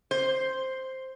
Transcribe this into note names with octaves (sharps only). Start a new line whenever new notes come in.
C5